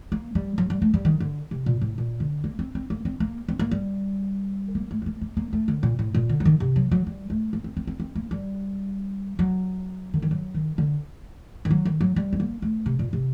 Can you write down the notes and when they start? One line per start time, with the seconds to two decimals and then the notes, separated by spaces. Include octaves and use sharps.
0.12 A#3
0.35 G3
0.58 F#3
0.70 G3
0.82 A3
0.94 G3
1.05 D#3
1.20 D3
1.51 C3
1.66 A#2
1.81 A2
1.98 A#2
2.20 D3
2.44 A#3
2.59 C4
2.75 C4
2.90 A#3
3.05 C4
3.20 A#3
3.49 C4
3.59 A#3
3.71 G3
4.75 A#3
4.91 A3
5.02 C4
5.06 A#3
5.21 A#3
5.37 A#3
5.53 A3
5.68 D3
5.83 A#2
5.99 A2
6.15 A#2
6.29 D3
6.40 F#3
6.45 D#3
6.60 C3
6.76 F#3
6.91 F#3
7.07 G3
7.30 A3
7.53 A#3
7.64 C4
7.77 C4
7.87 C4
8.00 C4
8.15 A#3
8.31 G3
9.39 F#3
10.14 D3
10.22 D#3
10.31 F#3
10.54 D#3
10.78 D3
11.65 D#3
11.71 F#3
11.85 D#3
12.01 F#3
12.16 G3
12.33 C4
12.40 A#3
12.62 A3
12.86 C3
12.99 A#2
13.13 C3